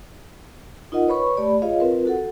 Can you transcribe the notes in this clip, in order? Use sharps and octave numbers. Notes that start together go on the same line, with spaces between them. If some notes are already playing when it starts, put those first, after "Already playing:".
D#4 F4 A#4 D#5 F#5
B4 C#5 B5 C#6
A3 G4 D5 B5
F4 G#4 C#5 D#5 F5
C4 F4 A#4 B4
F#4 A4 F#5